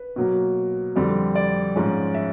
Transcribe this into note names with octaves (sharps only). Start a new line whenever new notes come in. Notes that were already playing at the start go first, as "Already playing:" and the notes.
Already playing: B4
B2 F#3 A#3
F2 D3 G3 C4
D5
G#2 F3 G#3 C#4
E5